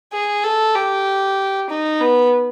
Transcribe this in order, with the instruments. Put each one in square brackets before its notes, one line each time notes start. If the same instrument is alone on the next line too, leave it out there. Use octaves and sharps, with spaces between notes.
[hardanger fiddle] G#4
A4
G4
D#4
B3